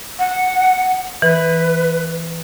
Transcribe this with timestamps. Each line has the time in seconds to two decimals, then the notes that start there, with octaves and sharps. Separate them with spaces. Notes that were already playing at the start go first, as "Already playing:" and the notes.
0.19 F#5
1.22 E3 B4